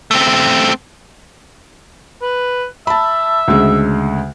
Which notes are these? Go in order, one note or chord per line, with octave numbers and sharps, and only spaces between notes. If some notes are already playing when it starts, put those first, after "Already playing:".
A3 C4
B4
E5 A5 B5
D2 C#3 G#3